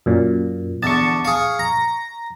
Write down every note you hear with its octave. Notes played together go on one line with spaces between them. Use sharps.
F#2 A#2
E2 D3 A5 C#6
G#4 F5 C#6
A#5